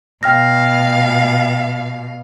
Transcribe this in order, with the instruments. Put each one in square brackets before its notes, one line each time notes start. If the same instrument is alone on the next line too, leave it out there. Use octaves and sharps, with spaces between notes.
[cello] B2 F5 [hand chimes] G5 F6 A#6